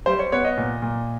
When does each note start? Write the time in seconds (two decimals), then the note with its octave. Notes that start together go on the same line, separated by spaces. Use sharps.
0.06 G3 C5
0.19 C#5
0.32 B3 C#5
0.45 D#5
0.57 A#2
0.82 A#2